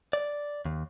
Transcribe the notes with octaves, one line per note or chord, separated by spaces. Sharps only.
D5
D#2